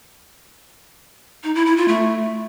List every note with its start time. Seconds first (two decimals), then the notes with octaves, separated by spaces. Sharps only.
1.44 D#4
1.55 E4
1.66 E4
1.77 F4
1.88 A3